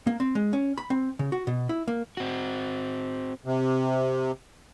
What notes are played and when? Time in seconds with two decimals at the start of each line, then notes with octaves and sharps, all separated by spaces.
0.07 A#3
0.20 C4
0.35 G#3
0.53 C#4
0.78 B5
0.90 C4
1.19 C#3
1.32 F#4
1.47 B2
1.69 E4
1.88 A#3
2.17 C4 F#4
3.46 C3